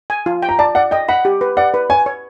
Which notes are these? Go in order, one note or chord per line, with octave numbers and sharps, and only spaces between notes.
G#5
F4
G5
A#5
D5 A5
D5 F#5
D#5 G5
F#5 B5
G4
B4
D5 F#5
B4
C#5 G#5
C#5